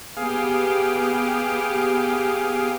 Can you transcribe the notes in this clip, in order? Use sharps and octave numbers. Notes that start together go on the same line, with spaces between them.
B3 G4 G#4 F5